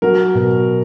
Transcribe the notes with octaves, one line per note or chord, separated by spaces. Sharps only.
F#3 A#4
B2